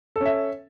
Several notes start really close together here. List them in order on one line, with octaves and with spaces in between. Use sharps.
A4 C#4 E5